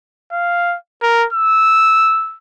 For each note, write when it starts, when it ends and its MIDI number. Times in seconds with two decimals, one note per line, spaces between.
0.32 0.76 77
1.03 1.26 70
1.33 2.37 88